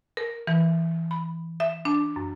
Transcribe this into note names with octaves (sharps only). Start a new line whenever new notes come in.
A#4
E3
B5
E5
D4
F#2